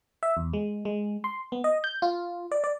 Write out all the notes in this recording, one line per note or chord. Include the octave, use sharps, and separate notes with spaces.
E5
E2
G#3
G#3
C6
B3
D#5
G6
F4
D5
D5